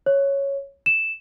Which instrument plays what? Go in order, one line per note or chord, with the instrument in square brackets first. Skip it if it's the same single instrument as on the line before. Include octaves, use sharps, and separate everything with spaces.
[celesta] C#5
E7